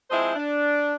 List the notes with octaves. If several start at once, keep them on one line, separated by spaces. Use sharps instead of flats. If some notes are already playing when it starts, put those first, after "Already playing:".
F3 G#3 C4 E4 C5 D#5
D4